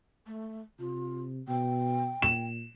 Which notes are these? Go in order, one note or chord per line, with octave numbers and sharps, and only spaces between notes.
A3
C3 F4
B2 G5
A#2 E7